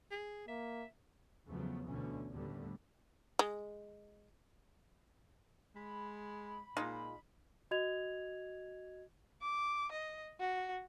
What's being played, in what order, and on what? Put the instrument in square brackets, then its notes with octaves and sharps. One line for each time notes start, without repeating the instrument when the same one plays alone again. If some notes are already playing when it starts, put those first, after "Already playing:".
[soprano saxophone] G#4
[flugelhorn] A#3 [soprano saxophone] E5
[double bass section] E2 C#3 F3 F#3 A3 B3
D2 B2 D3 E3 C#4
D#2 A2 D3 G3 A3 B3
[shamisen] G#3
[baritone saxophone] G#3 [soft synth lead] B5
[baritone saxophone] A#2 [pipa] G#3 D#4 F4
[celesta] F#4 D#5 G#6 F7
[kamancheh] D6
D#5
F#4